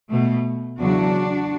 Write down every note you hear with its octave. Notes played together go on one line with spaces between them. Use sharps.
B2 A3
E2 C#3 F#3 D4 F#4